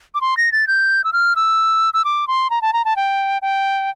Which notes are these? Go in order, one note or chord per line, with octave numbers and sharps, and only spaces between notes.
D6
C6
A#6
A6
G6
E6
F6
E6
E6
D6
C6
A#5
A5
A#5
A5
G5
G5